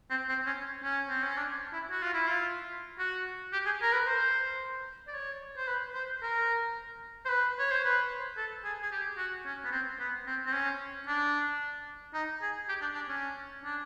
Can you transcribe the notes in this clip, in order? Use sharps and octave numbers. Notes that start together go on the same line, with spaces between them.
C4
C4
C#4
C#4
C4
C#4
D4
E4
F#4
F4
E4
F4
F#4
G4
G#4
A#4
B4
C5
D5
C#5
C5
B4
C5
A#4
C5
B4
C#5
C5
B4
A4
G#4
G#4
G4
F#4
C#4
B3
C4
B3
C4
C4
C#4
D4
D#4
G#4
G4
D4
D4
C#4
D4